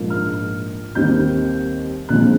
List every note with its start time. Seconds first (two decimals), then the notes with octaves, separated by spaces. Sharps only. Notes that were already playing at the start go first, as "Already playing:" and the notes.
Already playing: A#1 G#2 F3 A#3
0.10 F6
0.95 D#2 D#3 G3 C4 G6
2.09 A#1 A#2 F3 G#3 C4 F#6